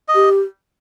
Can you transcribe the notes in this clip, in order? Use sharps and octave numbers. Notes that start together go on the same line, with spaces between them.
D#5
G4